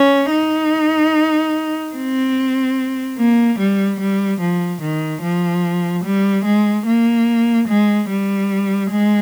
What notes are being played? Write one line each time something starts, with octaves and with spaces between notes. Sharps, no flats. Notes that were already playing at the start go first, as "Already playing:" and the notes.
Already playing: C#4
D#4
C4
A#3
G3
G3
F3
D#3
F3
G3
G#3
A#3
G#3
G3
G#3